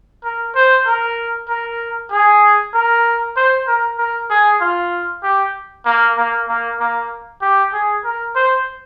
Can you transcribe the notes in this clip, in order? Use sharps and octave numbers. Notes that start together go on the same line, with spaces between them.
A#4
C5
A#4
A#4
G#4
A#4
C5
A#4
A#4
G#4
F4
G4
A#3
A#3
A#3
A#3
G4
G#4
A#4
C5